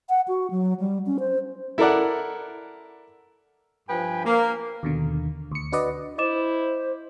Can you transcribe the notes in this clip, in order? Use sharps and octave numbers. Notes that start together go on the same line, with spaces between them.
F#5
F#4
F#3
G3
C#4
C5
E4 A4 A#4 D5 F#5
G2 F3 B4 G5 G#5
A#3
D#2 B2 D3
D2 C#7
D4 F#4 B4 D5 D#5
E4 C5 D#5 D6 E7